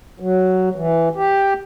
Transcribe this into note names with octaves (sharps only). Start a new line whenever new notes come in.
F#3
E3
G4